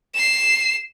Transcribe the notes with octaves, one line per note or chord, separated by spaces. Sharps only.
C7 E7